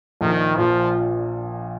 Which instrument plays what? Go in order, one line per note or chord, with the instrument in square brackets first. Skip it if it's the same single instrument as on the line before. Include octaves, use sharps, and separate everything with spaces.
[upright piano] A#1 [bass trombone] D#3
[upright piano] A#2 [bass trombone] F3